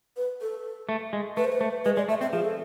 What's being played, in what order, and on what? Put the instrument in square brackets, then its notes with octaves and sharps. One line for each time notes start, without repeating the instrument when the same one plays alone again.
[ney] B4
A4
[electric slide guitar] A3
G#3
[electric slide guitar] A3 [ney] B4
[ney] C5
B4
[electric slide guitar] A3
[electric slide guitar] G#3 [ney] B4
[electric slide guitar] G#3 [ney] D5
[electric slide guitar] A3 [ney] E5
[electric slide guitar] C4 [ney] E5
[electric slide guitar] F3 [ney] G#4
[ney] A4